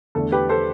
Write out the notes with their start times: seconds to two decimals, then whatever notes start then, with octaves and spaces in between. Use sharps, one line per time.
0.15 E2 D3 A3 A4
0.32 G4 B4
0.49 A4 C5